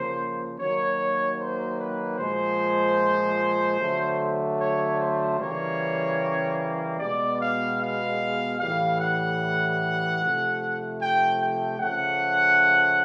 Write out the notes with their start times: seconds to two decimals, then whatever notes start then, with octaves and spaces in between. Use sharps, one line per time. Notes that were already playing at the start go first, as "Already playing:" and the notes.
Already playing: C#3 F3 A#3 C5
0.59 D#3 F#3 A#3 C#5
1.39 C5
1.79 B4
2.19 A#2 F3 G#3 C5
3.79 D3 F#3 A3
4.59 C#5
4.99 C5
5.39 C#3 E3 G3 A#3 C#5
6.99 B2 G#3 B3 D5
7.39 F5
7.80 F5
8.59 A2 E3 G3 F5
9.00 F#5
10.20 C3 F3 A3
11.00 G5
11.40 G5
11.79 C#3 F3 A3 F#5